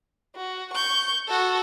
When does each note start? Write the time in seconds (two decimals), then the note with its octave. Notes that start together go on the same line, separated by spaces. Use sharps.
0.36 F#4
0.73 C#6 G6
1.28 F#4 A4